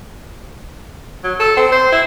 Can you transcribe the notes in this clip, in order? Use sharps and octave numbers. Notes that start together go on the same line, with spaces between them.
F#3
A4
C4
C5
E4